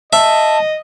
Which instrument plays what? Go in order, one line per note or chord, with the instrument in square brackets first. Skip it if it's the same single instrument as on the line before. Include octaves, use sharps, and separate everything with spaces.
[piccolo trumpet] D#5 [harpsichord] E5 [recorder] A5